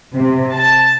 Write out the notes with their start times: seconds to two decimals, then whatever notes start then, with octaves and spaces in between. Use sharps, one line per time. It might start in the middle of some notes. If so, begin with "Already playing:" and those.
0.15 C3
0.56 A5